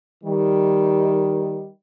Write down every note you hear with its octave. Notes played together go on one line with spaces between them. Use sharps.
D#3 G3